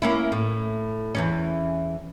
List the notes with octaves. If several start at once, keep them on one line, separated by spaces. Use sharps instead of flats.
A#3 C#4 E4
A2
E2 E3 C#4